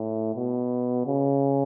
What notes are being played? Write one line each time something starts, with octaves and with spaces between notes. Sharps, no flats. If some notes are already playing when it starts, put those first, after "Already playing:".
Already playing: A2
B2
C#3